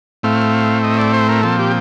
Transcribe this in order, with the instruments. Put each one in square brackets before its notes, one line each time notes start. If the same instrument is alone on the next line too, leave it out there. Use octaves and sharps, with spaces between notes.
[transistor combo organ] A2 A3 C4 F5
D#5
D5
C5
A#4
A#2 F3 C4 A4
G4